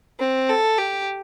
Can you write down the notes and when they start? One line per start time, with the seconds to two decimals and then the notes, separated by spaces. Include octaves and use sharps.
0.20 C4
0.49 A4
0.78 G4